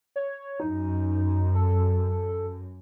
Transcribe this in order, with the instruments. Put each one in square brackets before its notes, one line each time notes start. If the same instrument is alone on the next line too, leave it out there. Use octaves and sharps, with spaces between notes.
[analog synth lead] C#5
[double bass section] F#2 [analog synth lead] D#4
[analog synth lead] A4